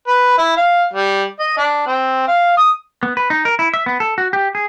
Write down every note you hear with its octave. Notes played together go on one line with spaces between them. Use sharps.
B4
E4
F5
G3
D#5
D4
C4
F5
D#6
B3
B4
D#4
A#4
E4
E5
B3
A4
F#4
G4
G#4